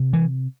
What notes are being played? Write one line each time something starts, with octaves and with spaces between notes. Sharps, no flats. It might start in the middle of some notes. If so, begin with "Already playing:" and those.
Already playing: C3
E3